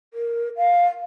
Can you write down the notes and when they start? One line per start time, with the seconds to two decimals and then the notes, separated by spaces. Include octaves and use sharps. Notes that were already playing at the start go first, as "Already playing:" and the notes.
0.14 A#4
0.57 F5